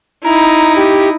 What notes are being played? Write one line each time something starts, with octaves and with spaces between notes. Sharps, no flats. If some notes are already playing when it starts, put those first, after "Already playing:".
D#4 E4 A#5
G4